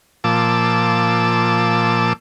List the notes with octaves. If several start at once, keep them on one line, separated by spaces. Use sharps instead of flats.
A#2 F3 A5 D6 E6